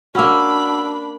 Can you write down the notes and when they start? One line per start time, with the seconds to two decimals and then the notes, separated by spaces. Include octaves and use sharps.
0.15 A#3 C#4 D4 F#4 F#5 B5 E6